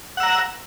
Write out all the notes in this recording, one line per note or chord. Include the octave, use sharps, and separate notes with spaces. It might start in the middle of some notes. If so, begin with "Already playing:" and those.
F#5 A#5 E6